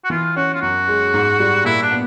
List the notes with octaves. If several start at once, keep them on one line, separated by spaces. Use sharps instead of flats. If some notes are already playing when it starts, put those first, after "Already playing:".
F#4
E3 F4
C#4 F#4
F4
F#2 F#4
G#3
G#2
G3
A#2 E4
D4
B3